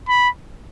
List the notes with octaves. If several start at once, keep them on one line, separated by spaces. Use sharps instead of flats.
B5